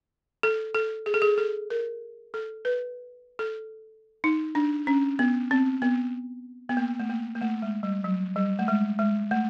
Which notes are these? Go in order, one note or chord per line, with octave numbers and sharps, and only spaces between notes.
A4
A4
G#4
A4
G#4
A4
A#4
A4
B4
A4
D#4
D4
C#4
B3
C4
B3
B3
A#3
A3
A#3
A#3
A3
G#3
G3
F#3
G3
A3
G#3
G#3
A3